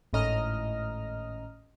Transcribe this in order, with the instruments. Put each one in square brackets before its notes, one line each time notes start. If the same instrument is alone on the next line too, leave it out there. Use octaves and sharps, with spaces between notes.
[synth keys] G#1 A2 C#4 D#5 A#5 F6